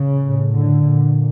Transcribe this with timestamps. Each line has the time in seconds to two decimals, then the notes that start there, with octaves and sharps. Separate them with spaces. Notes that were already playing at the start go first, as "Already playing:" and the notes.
Already playing: C#3
0.22 A2
0.54 D3
0.86 A#2